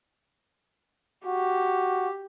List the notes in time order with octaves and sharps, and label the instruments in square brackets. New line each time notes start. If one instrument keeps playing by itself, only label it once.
[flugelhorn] F#4 [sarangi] G4